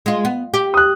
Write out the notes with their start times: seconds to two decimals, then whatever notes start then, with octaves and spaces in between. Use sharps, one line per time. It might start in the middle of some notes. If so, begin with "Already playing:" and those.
0.06 G#3 F4
0.25 B3
0.54 G4
0.74 D#6 F#6